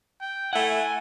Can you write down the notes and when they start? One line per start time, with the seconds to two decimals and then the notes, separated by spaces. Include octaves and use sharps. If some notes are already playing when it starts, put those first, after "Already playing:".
0.21 G5
0.53 A3 E4 F#5 G#5